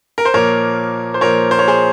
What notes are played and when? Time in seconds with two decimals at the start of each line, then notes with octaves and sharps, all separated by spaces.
0.18 A#4
0.25 C5
0.33 A#2 F3 A#3 A#4 C#5
1.14 C5
1.21 A#2 F3 A#3 A#4 C#5
1.51 C5
1.59 C#5
1.68 G#4 C5